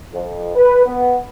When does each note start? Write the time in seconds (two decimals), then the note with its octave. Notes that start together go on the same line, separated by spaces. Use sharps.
0.13 F2
0.56 B4
0.86 B3